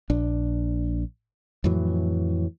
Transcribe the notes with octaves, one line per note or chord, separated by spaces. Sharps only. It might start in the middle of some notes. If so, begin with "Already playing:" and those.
A#1 D4
F2 A2 E3 F#3